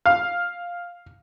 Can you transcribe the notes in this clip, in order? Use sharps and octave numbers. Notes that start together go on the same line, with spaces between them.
F5